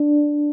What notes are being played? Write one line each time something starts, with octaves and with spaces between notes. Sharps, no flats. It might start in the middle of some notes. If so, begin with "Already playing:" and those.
Already playing: D4